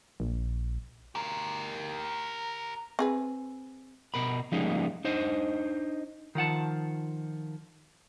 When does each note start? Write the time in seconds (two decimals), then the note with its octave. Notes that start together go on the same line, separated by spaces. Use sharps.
0.20 A#1
1.15 G4 A#4
2.99 C4 G#4 B4
4.14 B2 A#4 B5
4.52 F3 G3 G#3 A#3 C#4 D#4
5.05 D4 D#4 C5 D#5
6.35 D#3 F3 F#5 A5